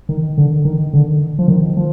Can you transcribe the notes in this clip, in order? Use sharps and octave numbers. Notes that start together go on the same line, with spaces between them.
D#3
D3
D#3
D3
F3
D#3
F3